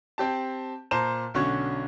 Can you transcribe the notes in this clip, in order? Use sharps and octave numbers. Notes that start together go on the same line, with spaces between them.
C4 G4 A5
A#2 C5 A5 A#5 E7
B1 D3 C#4 F#4 C#6 G#6